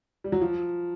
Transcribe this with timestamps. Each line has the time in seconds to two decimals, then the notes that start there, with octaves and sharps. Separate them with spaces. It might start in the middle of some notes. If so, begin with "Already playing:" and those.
0.24 G3
0.32 F#3
0.41 F3